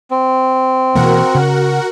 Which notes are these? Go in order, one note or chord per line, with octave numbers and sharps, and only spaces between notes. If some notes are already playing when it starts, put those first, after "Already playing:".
C4
B2 E3 A#3 F#4 A#4 F#5
C#3